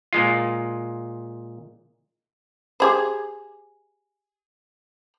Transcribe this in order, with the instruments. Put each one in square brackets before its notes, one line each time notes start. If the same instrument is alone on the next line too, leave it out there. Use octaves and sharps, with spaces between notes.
[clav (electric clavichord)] A#2 G#3 F4
[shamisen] G4 G#4 C5